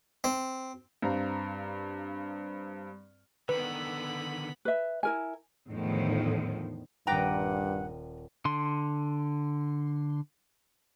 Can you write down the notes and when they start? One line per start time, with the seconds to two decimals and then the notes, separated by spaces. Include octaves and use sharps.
0.24 C4
1.02 G2 C4 F5 A#5
3.49 D3 D#3 B3 B4 B5
4.65 B4 E5
5.03 E4 A#4 G#5
5.69 E2 A2 D3 D#3 F3
7.07 D#1 G2 B4 F#5 G5 A#5 D6 A#6
8.45 D3 C6